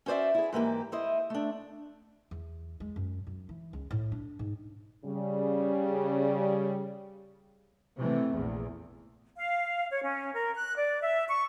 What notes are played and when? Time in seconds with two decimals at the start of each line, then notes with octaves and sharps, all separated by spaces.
0.06 C#4 F#4 C5 D5 E5
0.34 E4 G#4
0.53 G#2 E3 A#3 G4
0.92 E4 C5 D#5
1.30 A3 D4
2.31 E2
2.80 G#3
2.96 F#2
3.27 F#2
3.49 E3
3.73 C#2
3.91 A2
4.12 D4
4.39 G#2
5.05 C#3 G3
7.98 C3 E3 A3
8.32 A#1 E2
9.37 F5
9.90 C#5
10.03 C#4
10.33 A#4
10.55 F#6
10.77 D5
11.01 E5
11.29 C#6